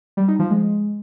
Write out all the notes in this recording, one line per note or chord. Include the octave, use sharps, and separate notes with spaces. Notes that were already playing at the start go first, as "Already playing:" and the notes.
G3
D#4
F3
G#3